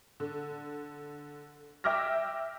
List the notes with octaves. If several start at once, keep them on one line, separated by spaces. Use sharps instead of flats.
D3
E5 G5 D6 F6 A#6